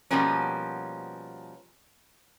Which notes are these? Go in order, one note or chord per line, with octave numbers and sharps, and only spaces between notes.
B2 F3 G3 A#3 B3 C#4